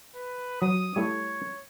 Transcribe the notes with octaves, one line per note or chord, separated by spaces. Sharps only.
B4
F#3 D#6
G3 A3 E4 C#5